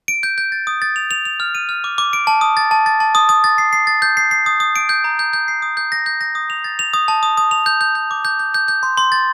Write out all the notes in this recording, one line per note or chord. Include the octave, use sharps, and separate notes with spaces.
D7
G6
G6
A6
D#6
A6
F7
F7
F7
F6
D#7
F6
D6
D6
D7
A5
D#6
A6
A5
A6
A5
D#6
D#6
A6
C7
C7
A6
G6
C7
C7
D#6
D#6
D7
G6
A#5
G6
G6
C7
D#6
G6
A#6
G6
A#6
D#6
F7
A6
F7
D#6
A5
D#6
D#6
F7
G6
G6
G6
D6
G6
G6
G6
G6
C6
C6
A6